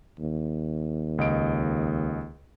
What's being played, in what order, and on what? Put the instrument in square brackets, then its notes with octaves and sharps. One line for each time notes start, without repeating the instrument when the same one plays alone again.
[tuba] D#2
[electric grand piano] C#2 D#5 D7